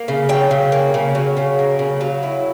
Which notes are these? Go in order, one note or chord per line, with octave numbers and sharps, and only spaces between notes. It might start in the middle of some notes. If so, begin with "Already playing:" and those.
Already playing: A#3
C#3
F#3 G5
C#3
A#3
C#3
F#3
C#3
A#3
C#3
F#3
E4